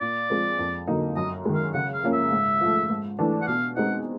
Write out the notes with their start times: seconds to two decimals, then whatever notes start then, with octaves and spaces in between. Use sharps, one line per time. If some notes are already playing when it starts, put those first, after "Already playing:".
0.01 A#2 D5
0.30 F3 G#3 C4
0.59 F2
0.88 D3 F#3 A#3 D#4
1.16 F#2 D#5
1.45 D#3 G#3
1.54 F5
1.74 C#3 F#5
1.93 F5
2.03 F3 A#3 C#4
2.13 E5
2.32 G#2
2.61 F3 A3
2.89 G#2
3.19 E3 A3 D4
3.41 F#5
3.47 B2 F5
3.76 G#3 C4 D#4 F#5